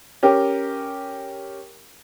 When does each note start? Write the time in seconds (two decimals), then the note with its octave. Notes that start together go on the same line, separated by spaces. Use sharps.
0.23 C#4 G4 A#4